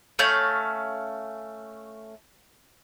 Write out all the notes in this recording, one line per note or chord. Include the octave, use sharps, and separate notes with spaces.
A3 C#4 F5 G6